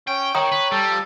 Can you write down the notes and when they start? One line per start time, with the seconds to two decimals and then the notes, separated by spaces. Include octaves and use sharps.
0.07 C#4 G5
0.35 D#3 C#5 G5 A#5 D#6
0.52 B4
0.72 G3 A4
0.90 F3